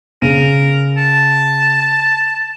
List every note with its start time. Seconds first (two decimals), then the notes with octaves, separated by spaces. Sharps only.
0.22 C#3 A#4 D#7
0.97 A5